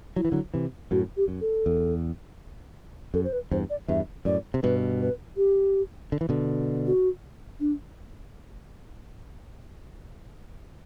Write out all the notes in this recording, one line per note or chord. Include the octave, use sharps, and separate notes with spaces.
F#3 E4
E3
D3 F#3
C3 E3
F#2 A2 F#4
G4
F#2
A4
E2
F#2 A4
C5
B4
E2 G2 C5
D5
E2 G2 E5
F#2 A2 D5
C3
G2 B2 B4
B4
G4
D3
E3
B2 D3
F#4
D4